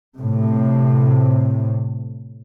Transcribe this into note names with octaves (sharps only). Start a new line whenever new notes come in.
A2 C3